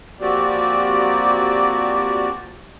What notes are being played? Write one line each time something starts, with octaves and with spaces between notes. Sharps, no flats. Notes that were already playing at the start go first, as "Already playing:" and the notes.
F3 A#3 C4 F#4 G4 D5